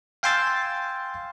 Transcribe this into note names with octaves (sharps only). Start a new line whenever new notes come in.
F5 G5 G#5 C6 E6 A6